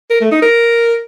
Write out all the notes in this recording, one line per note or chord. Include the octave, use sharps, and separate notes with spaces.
A#4
A3
D#4
A#4